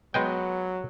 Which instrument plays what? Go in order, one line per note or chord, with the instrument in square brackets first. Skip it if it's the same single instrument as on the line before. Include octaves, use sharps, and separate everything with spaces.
[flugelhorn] F#3 [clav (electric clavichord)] G#3 D#5 G5 [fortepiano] B3